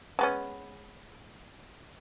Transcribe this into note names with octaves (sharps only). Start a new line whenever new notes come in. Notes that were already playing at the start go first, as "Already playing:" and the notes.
G#3 B3 C#4